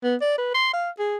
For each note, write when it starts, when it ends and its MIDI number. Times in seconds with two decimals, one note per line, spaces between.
0.04 0.15 59
0.21 0.37 74
0.38 0.52 71
0.54 0.72 84
0.73 0.90 77
0.99 1.17 68